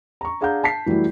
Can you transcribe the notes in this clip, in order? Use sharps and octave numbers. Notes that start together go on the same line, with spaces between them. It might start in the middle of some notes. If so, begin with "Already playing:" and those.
A#5 C#6
D4 G#4 F5 F#5 A#5 G6
A5 B6 C7
E3 F#3 G3 A3 E4